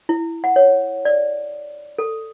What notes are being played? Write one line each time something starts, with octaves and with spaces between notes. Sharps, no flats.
E4
F#5
C#5
D5
A4